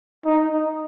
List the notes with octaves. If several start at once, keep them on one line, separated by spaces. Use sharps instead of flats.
D#4